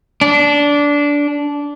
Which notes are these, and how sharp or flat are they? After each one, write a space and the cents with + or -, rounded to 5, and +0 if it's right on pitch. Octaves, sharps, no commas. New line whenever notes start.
D4 -15